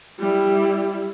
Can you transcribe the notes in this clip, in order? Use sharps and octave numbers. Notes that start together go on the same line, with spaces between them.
G3 E4